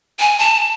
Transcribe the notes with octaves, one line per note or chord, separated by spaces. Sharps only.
G#5
A5